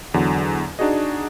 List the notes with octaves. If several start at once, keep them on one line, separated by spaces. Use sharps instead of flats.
E2 D3 F#3
D4 D#4 F#4 G#4 D#5